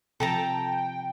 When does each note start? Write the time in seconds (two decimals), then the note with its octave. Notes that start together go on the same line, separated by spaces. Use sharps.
0.20 C3 F3 A4 G5 A5 A#5